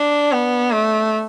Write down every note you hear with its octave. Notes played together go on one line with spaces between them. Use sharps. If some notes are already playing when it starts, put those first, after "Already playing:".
Already playing: D4
B3
A3